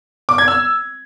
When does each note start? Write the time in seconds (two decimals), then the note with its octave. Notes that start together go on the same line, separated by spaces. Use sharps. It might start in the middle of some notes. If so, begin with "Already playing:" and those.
0.29 D6
0.38 G#6
0.48 E6